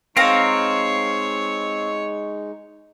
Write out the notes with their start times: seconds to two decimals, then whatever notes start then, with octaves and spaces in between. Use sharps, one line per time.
0.17 G#3 C4 D#4 C#5 F5 A#5